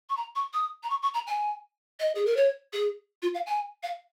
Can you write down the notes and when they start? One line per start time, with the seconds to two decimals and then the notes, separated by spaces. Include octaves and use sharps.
0.10 C#6
0.17 A#5
0.35 C#6
0.53 D#6
0.83 A#5
0.90 C#6
1.02 C#6
1.14 A#5
1.27 G#5
2.00 D#5
2.15 G#4
2.26 A#4
2.37 C#5
2.73 G#4
3.22 F4
3.35 F5
3.46 G#5
3.83 F5